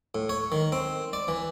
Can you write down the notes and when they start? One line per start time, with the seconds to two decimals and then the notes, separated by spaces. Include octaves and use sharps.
0.15 A2
0.29 C#5
0.52 D#3
0.72 C4
1.13 D5
1.28 E3